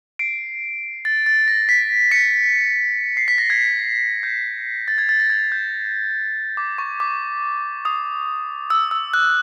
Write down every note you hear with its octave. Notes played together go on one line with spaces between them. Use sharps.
C7 D7
A6
A6
A#6
B6
B6 C#7
C7
B6
A#6
G#6
G6
A6
G#6
A6
A#6
G#6
G6
D6
C#6
D6
D#6
E6
E6
F#6